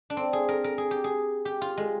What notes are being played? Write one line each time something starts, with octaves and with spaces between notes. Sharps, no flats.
D4
C4
G#4
A#4
A#4
G#4
G4
G#4
G4
F4
G#3